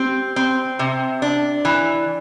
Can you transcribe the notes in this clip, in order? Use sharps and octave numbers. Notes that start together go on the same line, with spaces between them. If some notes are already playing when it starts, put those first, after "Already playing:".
Already playing: C4 G4
C4
C3
D4
E3